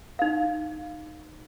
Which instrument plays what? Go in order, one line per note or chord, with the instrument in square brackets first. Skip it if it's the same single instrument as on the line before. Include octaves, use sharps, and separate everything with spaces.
[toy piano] D#4 F5